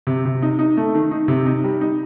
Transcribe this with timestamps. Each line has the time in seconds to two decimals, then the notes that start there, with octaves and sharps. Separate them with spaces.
0.07 C3
0.25 C3
0.42 D#4
0.59 D#4
0.77 A3
0.95 D#3
1.11 D#4
1.28 C3
1.46 D#4
1.64 G3
1.81 D#4